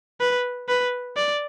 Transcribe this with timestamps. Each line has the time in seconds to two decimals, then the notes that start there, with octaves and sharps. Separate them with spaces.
0.21 B4
0.69 B4
1.16 D5